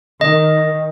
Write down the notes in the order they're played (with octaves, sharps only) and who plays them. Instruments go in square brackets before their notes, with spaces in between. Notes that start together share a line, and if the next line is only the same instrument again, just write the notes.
[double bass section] D#3 [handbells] D#5